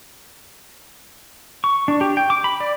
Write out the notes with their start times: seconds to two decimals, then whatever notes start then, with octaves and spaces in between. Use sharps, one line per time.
1.64 C#6
1.88 D4
2.01 G4
2.17 G5
2.30 D6
2.44 B5
2.60 D5